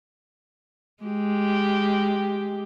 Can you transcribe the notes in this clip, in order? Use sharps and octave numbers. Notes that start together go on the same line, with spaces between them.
G#3 G4